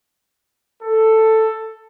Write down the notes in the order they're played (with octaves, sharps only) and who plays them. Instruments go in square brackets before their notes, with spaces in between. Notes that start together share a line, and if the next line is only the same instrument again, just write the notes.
[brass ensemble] A4